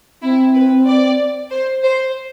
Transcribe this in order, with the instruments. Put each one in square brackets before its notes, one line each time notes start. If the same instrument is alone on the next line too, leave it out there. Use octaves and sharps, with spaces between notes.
[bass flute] C4 [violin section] E4
[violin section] B4
D5
C5
C5